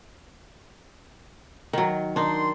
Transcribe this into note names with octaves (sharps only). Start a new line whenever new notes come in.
D#3 F#3
D#3 D4 D#4 C6